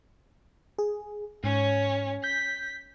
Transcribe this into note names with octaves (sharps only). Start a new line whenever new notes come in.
G#4
G#2 C#4 C#5
G6 B6